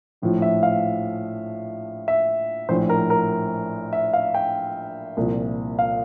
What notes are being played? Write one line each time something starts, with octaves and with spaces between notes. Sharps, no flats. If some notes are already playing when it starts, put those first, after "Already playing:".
A#1 A2 F3
E5
F5
E5
A#1 A2 F3 C5
A#4
A#4
E5
F5
G5
C2 A#2 F3
F5